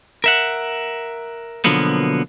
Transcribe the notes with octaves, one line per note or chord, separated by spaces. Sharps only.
A#4 E5 F#5
B2 D3 F3 F#3 A#3 B3